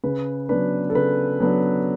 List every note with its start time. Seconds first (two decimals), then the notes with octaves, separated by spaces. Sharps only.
0.04 C#3 B4
0.49 F#3 B3 D4 B4
0.90 A4
0.95 C#3 B4
1.40 F#3 B3 D4